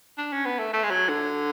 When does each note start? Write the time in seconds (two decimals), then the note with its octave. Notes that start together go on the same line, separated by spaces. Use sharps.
0.18 D4
0.32 C#4
0.45 B3
0.59 A3
0.73 A3
0.83 G#3
0.90 F#3
1.09 D3